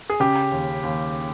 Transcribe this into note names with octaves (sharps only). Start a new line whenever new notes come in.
G#4
C#3 G4
D#2
D#2